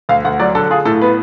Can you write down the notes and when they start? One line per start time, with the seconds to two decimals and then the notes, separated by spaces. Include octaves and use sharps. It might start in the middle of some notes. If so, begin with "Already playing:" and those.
0.09 D2 F5
0.25 D2 F#5
0.40 F#3 D5
0.55 D3 A4
0.71 F4 G#4
0.85 A2 A4
1.01 B3 B4